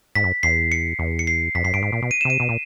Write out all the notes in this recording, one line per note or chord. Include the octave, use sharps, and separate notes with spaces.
G#2 B6
F#2
E2 C7
C#7
E2
C#7
C7
F2 B6
F#2 C7
G2 D7
G#2
A#2
B2
D#7
E7
C3
D#7
B2
A#2